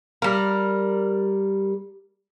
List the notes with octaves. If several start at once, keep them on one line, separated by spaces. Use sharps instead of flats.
G3 A#4